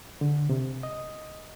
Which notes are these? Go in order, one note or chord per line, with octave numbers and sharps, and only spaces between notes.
D3
C3
D#5